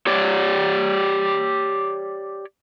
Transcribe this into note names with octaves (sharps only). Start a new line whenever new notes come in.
G4 C#5 D5